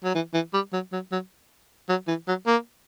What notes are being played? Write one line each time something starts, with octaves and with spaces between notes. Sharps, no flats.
F#3
E3
E3
G3
F#3
F#3
F#3
F#3
E3
F#3
A#3